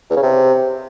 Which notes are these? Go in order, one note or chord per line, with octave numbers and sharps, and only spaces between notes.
E2
C#3
C3